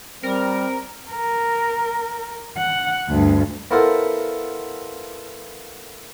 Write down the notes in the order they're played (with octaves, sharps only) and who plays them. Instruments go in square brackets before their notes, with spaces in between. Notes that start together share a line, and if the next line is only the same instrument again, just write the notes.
[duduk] G3 [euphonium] C4 [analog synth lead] A#4
[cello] A#4
F#5
D2 G2
[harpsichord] B3 E4 F4 A4 A#4 C5